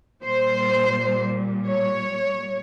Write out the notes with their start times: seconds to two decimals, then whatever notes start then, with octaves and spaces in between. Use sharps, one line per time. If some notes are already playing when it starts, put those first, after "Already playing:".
0.22 A#2 G3 C5
1.66 C#5